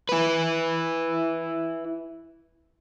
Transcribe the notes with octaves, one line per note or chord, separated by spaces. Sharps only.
E4 B4